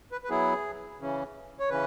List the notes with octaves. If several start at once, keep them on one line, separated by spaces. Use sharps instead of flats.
B4
B4
F#3 B3 E4 G#4
C#3 E3 C#4
C#5
C#3 E3 C#4 B4